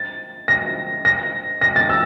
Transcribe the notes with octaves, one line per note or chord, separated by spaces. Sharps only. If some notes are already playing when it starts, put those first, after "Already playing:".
Already playing: A6
A#6
A#6
A#6
A6
E6